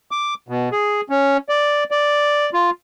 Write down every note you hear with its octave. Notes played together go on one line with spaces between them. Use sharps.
D6
B2
G#4
C#4
D5
D5
F4